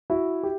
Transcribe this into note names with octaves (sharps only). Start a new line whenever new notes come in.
E4 F#4
G4